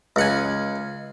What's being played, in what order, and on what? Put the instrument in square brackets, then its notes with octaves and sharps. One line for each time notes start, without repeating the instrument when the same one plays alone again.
[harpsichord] C#2 F#5 G#5